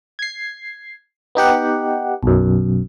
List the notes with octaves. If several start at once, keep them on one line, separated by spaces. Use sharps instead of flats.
G#6 C7
B3 D#4 G4 F#5
B1 F#2